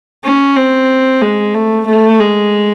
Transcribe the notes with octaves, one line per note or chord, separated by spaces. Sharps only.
C#4
C4
G#3
A3
A3
G#3